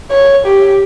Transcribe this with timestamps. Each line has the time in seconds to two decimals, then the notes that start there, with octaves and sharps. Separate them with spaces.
0.11 C#5
0.47 G4